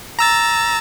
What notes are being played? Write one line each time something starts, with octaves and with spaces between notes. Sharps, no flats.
A#5 E6 A6